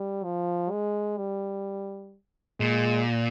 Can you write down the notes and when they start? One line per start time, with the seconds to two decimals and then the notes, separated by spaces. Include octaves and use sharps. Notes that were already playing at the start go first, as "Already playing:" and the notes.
Already playing: G3
0.24 F3
0.71 G#3
1.18 G3
2.60 A#2 G#3